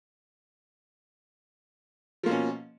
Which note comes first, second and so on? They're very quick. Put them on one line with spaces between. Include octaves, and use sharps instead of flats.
F3 A#3 B2 C#4